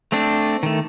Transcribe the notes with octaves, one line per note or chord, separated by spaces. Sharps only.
A3 C4 D4
D#3 A3